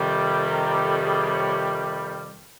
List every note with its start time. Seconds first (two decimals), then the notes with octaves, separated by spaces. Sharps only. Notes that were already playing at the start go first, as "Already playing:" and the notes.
Already playing: F2 C3 D#3 G3
0.47 A#4
0.75 A4
1.04 G#4
1.33 C#5